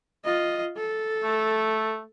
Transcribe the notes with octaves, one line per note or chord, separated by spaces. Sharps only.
F4 D#5
A4
A3